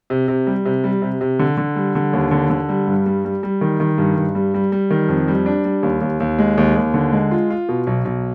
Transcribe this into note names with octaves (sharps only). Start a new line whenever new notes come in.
C3
C3
G3
C3
G3
C3
C3
D3
D3
G3
D3
D#2
D3
D3
G3
G2
G3
G3
G3
D#3
D#3
G2
G2
G3
G3
G3
D#3
F2
G3
D4
G3
D#2
D#2
D#2
G#3
D#2
D#2
D3
G#3
F4
F4
B2
B1
B1